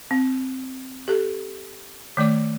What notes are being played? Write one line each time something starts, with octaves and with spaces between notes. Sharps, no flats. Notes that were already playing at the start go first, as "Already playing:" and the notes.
C4
G4 A4
D#3 A3 D5 D6